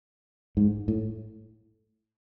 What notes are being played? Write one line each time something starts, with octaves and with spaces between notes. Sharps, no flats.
G#2
A2